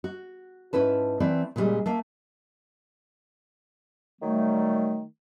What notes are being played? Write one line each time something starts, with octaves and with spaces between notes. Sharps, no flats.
F#4
G#2 C#4 E4 B4 A5
E3 A3 C4 E4 D5
A#2 C#3 E3 G3 G#3
A3 A#3 F5
D#3 F#3 G3 A3